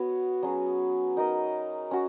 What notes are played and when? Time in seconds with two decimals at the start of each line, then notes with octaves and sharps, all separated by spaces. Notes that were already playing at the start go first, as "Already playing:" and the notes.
Already playing: B3 F#4 C#5
0.43 F#3 C#4 G#4
1.17 D#4 A#4 D#5
1.91 C#4 F#4